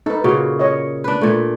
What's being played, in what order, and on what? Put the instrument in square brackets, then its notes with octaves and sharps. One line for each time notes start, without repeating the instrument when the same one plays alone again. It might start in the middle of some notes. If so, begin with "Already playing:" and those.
[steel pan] D#4 B4 [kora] A4
[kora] A#2 C#3 [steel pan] F#4
[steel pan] C#5 D#5
[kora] D4 B4
A#2 A3